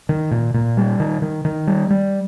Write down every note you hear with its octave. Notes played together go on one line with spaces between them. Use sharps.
D#3
A#2
A#2
G3
D#3
D#3
D#3
G3
G3